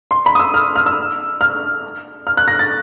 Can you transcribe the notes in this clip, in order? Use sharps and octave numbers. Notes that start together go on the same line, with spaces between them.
C6
B5
D#6
E6
F6
F6
E6
F6
F6
F#6
A#6
A6